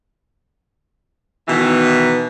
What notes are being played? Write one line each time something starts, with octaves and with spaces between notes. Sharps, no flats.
B2 D#3 E3